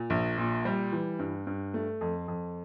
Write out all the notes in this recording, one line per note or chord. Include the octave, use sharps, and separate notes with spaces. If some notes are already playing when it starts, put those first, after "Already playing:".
Already playing: A#2
A#1
A#2
G3
E3
G2
G2
A3
F2
F2